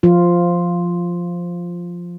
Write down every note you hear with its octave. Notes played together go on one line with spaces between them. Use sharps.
F3 F4